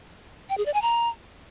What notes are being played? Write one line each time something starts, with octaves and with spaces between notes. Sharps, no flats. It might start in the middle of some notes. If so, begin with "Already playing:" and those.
G5
G#4
D5
G#5
A#5